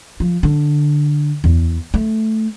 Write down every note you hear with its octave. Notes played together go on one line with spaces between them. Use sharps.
F3
D3
E2
A3